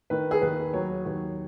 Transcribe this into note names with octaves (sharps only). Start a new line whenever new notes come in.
D#3 B4
G#4
D#2 B4
F#3 C#5
D#2